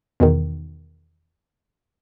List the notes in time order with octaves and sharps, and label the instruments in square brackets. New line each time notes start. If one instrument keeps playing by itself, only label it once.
[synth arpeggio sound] E2 B2 D#3